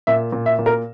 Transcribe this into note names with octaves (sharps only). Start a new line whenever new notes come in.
A#2 E5
A#2
E5
A#2
A#4